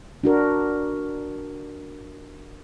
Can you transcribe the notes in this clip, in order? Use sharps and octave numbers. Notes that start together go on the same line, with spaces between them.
D4 F#4 A#4